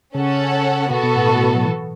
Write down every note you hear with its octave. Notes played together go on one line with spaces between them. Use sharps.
C#3 C#4 A4 F#5
B2 B3 F#4 A4
B2
A2
B2
A2
B2
F#3
E3